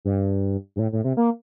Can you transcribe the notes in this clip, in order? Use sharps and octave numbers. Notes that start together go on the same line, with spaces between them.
G2
G2
A2
A2
C3
A#3